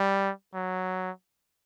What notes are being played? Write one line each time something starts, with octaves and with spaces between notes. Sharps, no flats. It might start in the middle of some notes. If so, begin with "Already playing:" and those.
Already playing: G3
F#3